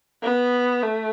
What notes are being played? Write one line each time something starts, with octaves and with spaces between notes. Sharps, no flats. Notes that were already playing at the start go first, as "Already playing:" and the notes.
B3
A3